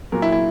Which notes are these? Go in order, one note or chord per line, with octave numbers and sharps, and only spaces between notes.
A#2 F#3 A#4
E4
E4